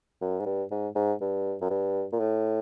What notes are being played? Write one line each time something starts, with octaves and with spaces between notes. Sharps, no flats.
F#2
G#2
G2
G#2
G#2
G2
F#2
G2
A#2
A2